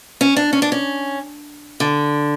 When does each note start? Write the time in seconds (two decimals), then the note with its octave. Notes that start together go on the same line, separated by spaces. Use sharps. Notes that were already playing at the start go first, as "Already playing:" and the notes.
0.21 C#4
0.36 D4
0.53 C#4
0.62 D4
0.72 C#4
1.80 D3